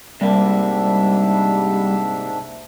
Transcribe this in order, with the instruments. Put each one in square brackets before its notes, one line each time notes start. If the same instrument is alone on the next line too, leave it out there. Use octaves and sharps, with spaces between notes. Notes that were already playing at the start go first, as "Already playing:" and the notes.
[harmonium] G#2 D4 E5 [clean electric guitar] C3 A#3 [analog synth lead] G3